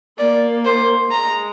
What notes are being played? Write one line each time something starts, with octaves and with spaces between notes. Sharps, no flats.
A#3 D5
C5
G#3 A#5